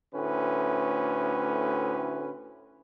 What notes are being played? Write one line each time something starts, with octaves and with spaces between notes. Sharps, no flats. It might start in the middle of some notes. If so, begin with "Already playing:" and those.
D2 A2 C#4 B4